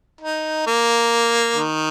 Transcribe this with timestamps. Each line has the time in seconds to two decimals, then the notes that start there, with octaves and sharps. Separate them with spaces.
0.21 D#4
0.67 A#3
1.55 D#3